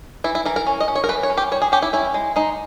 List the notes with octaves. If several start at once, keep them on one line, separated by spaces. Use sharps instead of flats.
E3 E4
E4
E3 A#4
A#4
C#4
D#5
C#4
C#5
A#4
E3 B4
C#5
C#4
G4
G3 C#5
G#4
C#4 G4
E4
C#4 E4
G#3
G#3 D#4